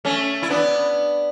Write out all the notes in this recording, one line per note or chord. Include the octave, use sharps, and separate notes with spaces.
A3 C#4
E4
B3 D4